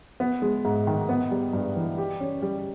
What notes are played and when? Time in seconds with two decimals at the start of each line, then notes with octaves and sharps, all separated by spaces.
0.20 B3
0.42 G#3
0.65 G#2
0.87 D#3
1.09 B3
1.31 G3
1.53 G2
1.76 E3
1.98 G4
2.20 C#4
2.42 G3